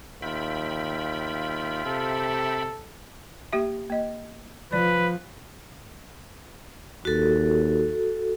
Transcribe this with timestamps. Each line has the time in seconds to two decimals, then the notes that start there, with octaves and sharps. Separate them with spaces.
0.22 D#2 F4 E5 G5 B5
1.86 C3 A4
3.53 A#3 G4 E5
3.90 A#3 D#5
4.73 F3 B4 D5
7.05 D#2 F#4 A4